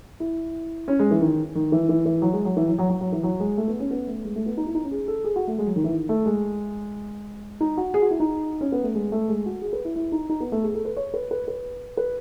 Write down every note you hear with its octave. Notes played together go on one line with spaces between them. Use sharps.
E4
C#4
G#3
E3
D#3
D#3
E3
E3
E3
F#3
G#3
F#3
E3
F#3
F#3
F#3
F#3
E3
F#3
G#3
A3
B3
C#4
B3
A3
G#3
A3
B3
D#4
E4
D#4
C#4
G#4
A4
G#4
F#4
A3
G#3
F#3
D#3
E3
D#3
A3
G#3
D#4
F#4
G#4
F#4
E4
D#4
C#4
B3
A3
G#3
A3
G#3
F#4
G#4
B4
E4
E4
D#4
D#4
B3
A3
G#4
A4
B4
C#5
B4
B4
B4
B4